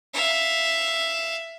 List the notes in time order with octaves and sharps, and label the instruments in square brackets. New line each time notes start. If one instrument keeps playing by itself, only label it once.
[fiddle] E5 F5